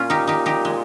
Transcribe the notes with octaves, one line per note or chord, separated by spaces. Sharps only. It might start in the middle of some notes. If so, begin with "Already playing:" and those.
Already playing: A#2 C#4 F4
D#4 G4
D#4 G4
D#4 G4
G#3